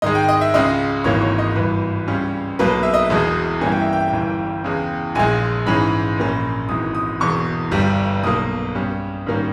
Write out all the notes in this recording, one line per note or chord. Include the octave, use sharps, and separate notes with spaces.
G#2 D#3 G#3 D#5
G5
D#5
E5
C#2 C#3 G#3 C#4 D#5
G#1 G#2 E3 A#3 C#5
C#5
D#5
G#1 G2 E3 B4
C#2 C#3 G3 C#4
B1 B2 A#3 B4
E5
D#5
E1 E2 B2 G#3
G2 E3 G3 A#3 C#4 G#5
G5
E5
G5
G1 G2 E3 G3
E2 C#3 G#3
A#1 A#2 G#3 G#5
G#2 E3 G#3 C#4 B5
A#1 A#2 A#3 C#4
G#1 G#2 E3 D#6
D#6
E1 E2 B2 C#6
G1 G2 G3
B1 B2 A#3 D#6
G2 G3 C#4
G#2 D#3 G3 A#3 C#4